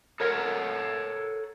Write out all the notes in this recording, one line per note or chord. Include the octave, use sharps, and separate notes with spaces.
A4 A#4 C#5 F#5